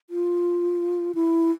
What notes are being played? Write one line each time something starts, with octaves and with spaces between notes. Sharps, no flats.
F4
E4